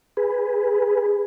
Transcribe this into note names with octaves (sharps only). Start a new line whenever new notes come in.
G#4 B4